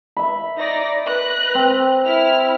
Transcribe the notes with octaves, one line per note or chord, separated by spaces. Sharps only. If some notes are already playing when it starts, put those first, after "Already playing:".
E5 B5
D#4 D5 A#6
B4 F#6 A#6
C4
E4 F6